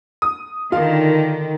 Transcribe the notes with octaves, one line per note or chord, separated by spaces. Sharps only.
D#6
D3 D#3 F4 F5